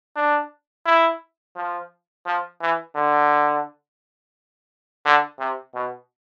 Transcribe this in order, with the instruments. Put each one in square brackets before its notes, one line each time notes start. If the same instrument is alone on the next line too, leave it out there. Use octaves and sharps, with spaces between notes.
[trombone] D4
E4
F3
F3
E3
D3
D3
C3
B2